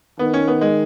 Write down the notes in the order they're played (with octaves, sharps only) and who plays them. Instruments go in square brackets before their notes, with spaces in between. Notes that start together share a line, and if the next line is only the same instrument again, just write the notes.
[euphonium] D#3 [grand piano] B3
[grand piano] C#4
B3
G#3